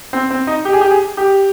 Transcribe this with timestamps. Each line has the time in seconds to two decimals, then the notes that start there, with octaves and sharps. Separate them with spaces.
0.13 C4
0.30 C4
0.47 D#4
0.65 G4
0.73 G#4
0.81 G4
0.91 G#4
1.17 G4